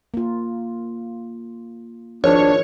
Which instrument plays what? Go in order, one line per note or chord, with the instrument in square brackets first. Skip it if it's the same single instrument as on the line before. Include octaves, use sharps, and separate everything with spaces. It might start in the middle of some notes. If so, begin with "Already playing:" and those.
[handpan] A#3 F4
[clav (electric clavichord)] G#1 [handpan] F3 [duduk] D4 [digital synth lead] C#5